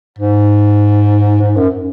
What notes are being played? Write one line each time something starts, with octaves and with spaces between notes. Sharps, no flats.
G#2
G#2
F#2